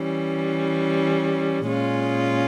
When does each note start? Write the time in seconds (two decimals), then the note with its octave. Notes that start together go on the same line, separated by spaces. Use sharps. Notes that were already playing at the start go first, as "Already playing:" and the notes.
Already playing: E3 G3 C#4
1.64 A#2 G#3 C#4 F4